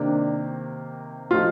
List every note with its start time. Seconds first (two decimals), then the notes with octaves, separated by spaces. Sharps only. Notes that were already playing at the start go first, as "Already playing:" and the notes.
Already playing: C3 D#3 A#3 D4
1.30 A2 F3 A3 D#4 F4